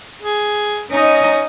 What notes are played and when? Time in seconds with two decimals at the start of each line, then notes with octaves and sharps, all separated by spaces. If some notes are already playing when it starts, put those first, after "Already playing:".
0.22 G#4
0.91 C#4 D#4 D#5